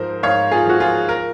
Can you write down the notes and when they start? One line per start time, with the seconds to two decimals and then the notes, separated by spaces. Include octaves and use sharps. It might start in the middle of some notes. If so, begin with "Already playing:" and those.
Already playing: G#2 F3 A#4 C5
0.23 G#2 C#5 F5
0.51 F4 G#4
0.66 F3 F#4
0.80 F4 G#4
1.09 A#4